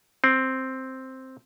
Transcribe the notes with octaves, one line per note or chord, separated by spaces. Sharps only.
C4